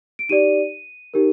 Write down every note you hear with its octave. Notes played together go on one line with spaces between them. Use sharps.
D7
D#4 G4 D5 D#7
D#4 G4 A#4